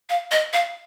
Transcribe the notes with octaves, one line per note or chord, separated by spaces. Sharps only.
F5
D#5
F5